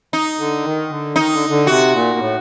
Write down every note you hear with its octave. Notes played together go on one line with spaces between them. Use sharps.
D#4
D3
D#3
D3
D#3 D#4
D3
D3
C3 F#4
A#2
A2